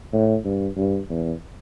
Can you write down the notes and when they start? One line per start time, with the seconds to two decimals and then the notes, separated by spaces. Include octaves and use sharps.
0.13 A2
0.45 G2
0.77 G2
1.10 E2